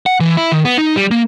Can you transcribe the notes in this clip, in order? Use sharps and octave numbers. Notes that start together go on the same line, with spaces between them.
F#5
E3
E4
D#3
B3
D#4
G3
A#3